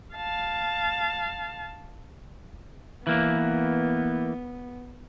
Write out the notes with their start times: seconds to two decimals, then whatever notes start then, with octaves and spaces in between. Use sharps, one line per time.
0.15 F5 A5
3.07 E3 A#3 B3